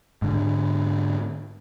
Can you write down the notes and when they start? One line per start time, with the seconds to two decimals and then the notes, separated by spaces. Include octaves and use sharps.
0.22 G#2 D3